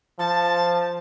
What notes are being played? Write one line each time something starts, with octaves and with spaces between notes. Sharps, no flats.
F3 A5